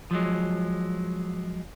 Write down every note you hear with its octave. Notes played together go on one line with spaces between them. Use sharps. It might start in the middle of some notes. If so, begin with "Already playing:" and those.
F3 F#3 G#3